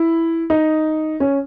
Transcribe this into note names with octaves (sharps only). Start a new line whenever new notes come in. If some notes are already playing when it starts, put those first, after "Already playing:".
Already playing: E4
D#4
C#4